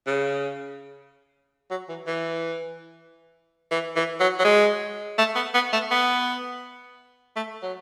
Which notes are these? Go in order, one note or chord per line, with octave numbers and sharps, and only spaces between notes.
C#3
F#3
E3
E3
E3
E3
F#3
F#3
G#3
A3
B3
B3
A3
B3
A3
F#3